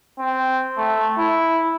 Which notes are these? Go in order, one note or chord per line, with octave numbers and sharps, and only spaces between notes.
C4
A3
E4